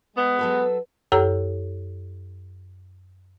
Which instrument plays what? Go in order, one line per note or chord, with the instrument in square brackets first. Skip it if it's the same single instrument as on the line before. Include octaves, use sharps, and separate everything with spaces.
[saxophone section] G#3 B3
[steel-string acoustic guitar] F#3 A4 B4
[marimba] F#2 G4 A4 C#5 A#5 E6